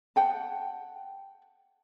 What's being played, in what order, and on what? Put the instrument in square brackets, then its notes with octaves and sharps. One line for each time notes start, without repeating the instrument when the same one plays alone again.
[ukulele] F#5 G5 A5